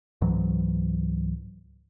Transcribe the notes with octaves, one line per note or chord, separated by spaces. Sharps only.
C#2 G#2 E3 F#3